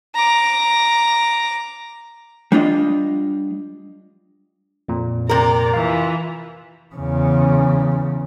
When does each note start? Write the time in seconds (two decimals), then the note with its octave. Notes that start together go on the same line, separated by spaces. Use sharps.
0.15 A#5 D6
2.52 G3 D4 F4 D#5
4.88 F2 A#2
5.29 C3 A#4 D5 A#5
5.74 E3 F4 F5
6.95 E2 C#3